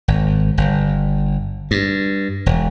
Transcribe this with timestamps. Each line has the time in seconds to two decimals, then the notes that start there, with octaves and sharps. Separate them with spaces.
0.08 G#1
0.58 G1
1.71 G2
2.46 E1